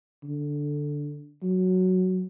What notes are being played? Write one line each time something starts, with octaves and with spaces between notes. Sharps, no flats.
D3
F#3